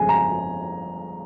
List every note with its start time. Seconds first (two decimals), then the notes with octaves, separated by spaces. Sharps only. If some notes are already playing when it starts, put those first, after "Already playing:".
Already playing: G1 F2 C#3 G#3 G#5
0.09 A#5